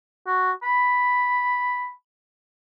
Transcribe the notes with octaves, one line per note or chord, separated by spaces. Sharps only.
F#4
B5